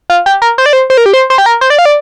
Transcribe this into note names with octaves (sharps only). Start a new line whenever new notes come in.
F4
G4
A#4
C5
D5
C5
C5
A#4
G4
C5
C5
G4
A#4
C5
D5
F5
D5